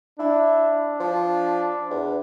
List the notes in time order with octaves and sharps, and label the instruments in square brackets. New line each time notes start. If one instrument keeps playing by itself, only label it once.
[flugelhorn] D4 [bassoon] E4
[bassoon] F3
E2